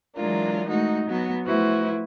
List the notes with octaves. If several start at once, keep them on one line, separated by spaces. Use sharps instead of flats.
E3 F#3 G#3 D4 F4 A#4
G#3 A3 D#4 F#4
F#3 B3 F#4
F3 A3 E4 F#4 B4 C5